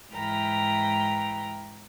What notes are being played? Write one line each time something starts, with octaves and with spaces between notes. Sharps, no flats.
G#2 E3 G5 A#5 B5 F6